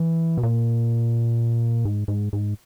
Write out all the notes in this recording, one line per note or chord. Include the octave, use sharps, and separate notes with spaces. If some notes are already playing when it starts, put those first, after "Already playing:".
Already playing: E3
B2
A#2
G#2
G#2
G#2